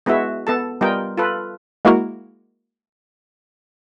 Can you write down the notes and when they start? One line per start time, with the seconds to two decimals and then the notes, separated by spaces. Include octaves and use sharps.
0.06 G#3 B3 E4 F#4 E5
0.47 B3 A4 A5
0.81 G3 B3 F4 A#4 D#5 G5
1.18 F4 A4 B4
1.85 G#3 A#3 E4 F#4 A#4